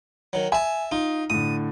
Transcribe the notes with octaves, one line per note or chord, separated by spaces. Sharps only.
D#3 F#3
E5 G#5 A5
D#4 F4
A2 D3 D#6